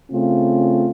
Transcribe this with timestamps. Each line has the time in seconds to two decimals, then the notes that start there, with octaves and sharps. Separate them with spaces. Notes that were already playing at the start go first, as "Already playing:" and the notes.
0.10 C#3 A3 C4 F4